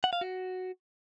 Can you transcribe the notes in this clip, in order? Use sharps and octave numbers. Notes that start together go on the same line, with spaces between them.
F#5
F5
F#4